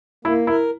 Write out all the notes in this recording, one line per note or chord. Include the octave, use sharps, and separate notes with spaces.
A#3 E4
E4 A#4